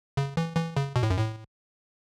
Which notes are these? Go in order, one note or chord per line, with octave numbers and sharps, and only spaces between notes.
C#3
E3
E3
C#3
B2
A2
F#2
A2